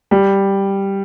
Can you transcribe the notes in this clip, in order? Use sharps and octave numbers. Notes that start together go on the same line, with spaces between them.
G3